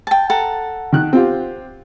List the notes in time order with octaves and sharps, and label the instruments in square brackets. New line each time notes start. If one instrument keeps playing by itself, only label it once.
[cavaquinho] G5 A5
A4 F#5 A#5
[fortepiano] D#3 F#6
C4 F4 G4